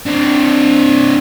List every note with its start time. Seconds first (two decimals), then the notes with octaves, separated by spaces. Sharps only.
0.06 C4 D4